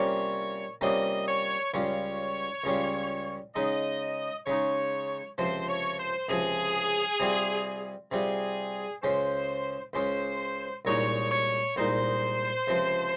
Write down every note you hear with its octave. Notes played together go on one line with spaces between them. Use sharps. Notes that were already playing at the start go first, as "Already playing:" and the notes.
Already playing: C3 G3 A#3 C#4 F4 C#5
C3 G3 A#3 C#4 F4 D#5
C#5
C#2 C#3 G3 C#4 F4 C#5
C#2 C#3 G3 C#4 F4
C#3 G#3 D#4 D#5
C#3 G#3 D#4 C#5
C#2 C3 F3 C5
C#5
C5
C#2 C3 F3 G#4
C3 G3 C4 F4
C3 G3 C4 F4 G#4
C#2 C#3 G#3 C#4 C5
C#2 C#3 G#3 C#4 C5
C2 A#2 G#3 D#4 C#5
C#5
C2 A#2 G#3 D#4 C5
C#2 C3 F3